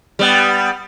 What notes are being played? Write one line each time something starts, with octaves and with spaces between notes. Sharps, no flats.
G3 B3